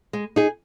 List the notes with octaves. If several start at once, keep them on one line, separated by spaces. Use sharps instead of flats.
G#3
D#4 G#4